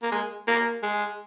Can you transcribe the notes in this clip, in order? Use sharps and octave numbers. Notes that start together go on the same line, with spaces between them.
A#3
G#3
A#3
G#3